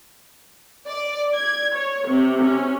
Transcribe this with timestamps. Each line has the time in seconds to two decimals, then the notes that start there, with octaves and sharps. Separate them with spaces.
0.87 D5
1.35 G#6
1.74 C#5
2.08 C3
2.44 C#4